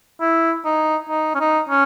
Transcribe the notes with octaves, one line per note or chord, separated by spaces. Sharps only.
E4
D#4
D#4
C#4
D#4
C#4